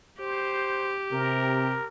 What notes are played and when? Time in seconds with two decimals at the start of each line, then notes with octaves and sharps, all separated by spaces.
0.20 G4 C5
1.12 C3 A#4